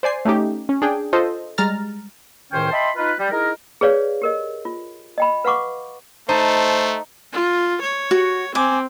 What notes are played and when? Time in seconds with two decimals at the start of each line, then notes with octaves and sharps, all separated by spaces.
0.03 C5 D5 G#5 C7
0.25 A3 C#4 D#4 G4
0.69 C#4
0.82 D4 G#4 G5
1.13 F4 A4 C5 D#5
1.58 G3 G#3 A#5 F6 A6
2.52 C#2 A2 D#3 C#4 C5 G5
2.72 D#5 E5 G5 A5 B5 C6
2.97 D#4 F4 B4
3.19 G3
3.31 D#4 E4 G#4 A#4
3.81 G#4 B4 C#5 D5 F5
4.22 G4 A#4 D#5
4.65 F4
5.18 D#5 G5 B5
5.44 B4 F5 F#5 C#6 D6
6.29 A3 D#4 C5 A5
7.33 F4
7.82 C#5
8.11 F#4
8.55 C4 G#5 D6